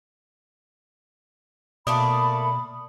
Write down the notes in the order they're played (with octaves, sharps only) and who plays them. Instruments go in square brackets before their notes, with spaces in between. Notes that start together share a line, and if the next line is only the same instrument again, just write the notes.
[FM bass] B2 [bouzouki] A3 A#3 D5 [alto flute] B5 [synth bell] D#6